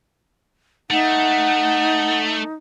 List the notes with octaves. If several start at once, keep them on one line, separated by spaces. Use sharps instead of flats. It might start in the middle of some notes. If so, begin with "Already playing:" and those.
A3 D#4 F#5